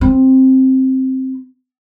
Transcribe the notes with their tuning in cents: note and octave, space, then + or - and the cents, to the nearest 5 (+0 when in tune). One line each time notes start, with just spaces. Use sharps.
C4 +5